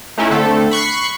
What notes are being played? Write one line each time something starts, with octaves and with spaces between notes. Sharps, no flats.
A3 C#4 D#4 E4
D3 A3 C4 A4
B5 C#6 F#6 C7